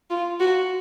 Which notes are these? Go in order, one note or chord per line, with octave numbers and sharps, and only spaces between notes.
F4
F#4